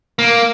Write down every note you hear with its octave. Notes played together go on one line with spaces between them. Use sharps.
A#3